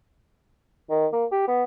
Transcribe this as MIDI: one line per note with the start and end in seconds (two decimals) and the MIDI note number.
0.90 1.07 51
1.13 1.25 58
1.32 1.44 67
1.48 1.64 59